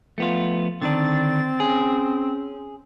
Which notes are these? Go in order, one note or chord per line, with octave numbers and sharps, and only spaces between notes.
F3 A3 B3 F4
D3 D#3 C4 D4 A6
C#4 G#4